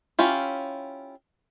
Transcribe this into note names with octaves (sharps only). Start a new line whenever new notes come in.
C#4 E4 F4 G4